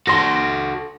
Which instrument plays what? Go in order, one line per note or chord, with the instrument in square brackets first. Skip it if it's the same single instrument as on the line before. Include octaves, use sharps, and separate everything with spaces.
[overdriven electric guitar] F#4 A4 [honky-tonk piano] C6 A#6